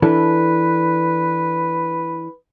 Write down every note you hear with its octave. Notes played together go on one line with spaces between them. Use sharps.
E3 D4 A4 B4